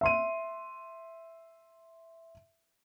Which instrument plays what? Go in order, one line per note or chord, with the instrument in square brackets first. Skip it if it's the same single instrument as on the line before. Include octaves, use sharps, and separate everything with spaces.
[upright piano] E5 C6 D#7